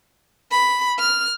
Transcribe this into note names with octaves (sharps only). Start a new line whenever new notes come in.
B5
F6